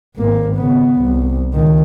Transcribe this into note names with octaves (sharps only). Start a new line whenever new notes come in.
G#1 A#3
C#3 B3
C2
C#2 D#3